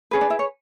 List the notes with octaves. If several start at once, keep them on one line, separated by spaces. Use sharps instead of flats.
C#4 G#4 B4
D4 D5
E4 E5
C#5